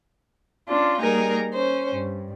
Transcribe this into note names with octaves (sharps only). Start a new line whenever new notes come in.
C#4 D4 F4
G3 A#3 D#4 G#4 A#4
C#4 C5
G2